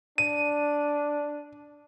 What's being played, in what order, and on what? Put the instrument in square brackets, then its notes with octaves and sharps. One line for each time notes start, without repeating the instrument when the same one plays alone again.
[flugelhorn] D4 [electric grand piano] D#7